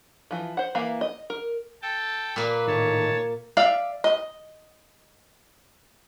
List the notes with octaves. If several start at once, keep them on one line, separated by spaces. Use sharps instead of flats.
E3 F3
C5 F#5
E3 A#3 F5 A#5
D#5
A#4
A4 G5 A5
A#2 A#3 B4
A2 D#3 C#5 A5
D5 E5 F5
D#5